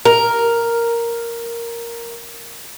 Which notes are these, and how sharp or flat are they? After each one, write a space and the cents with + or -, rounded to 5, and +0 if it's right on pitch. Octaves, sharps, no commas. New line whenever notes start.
A#4 +0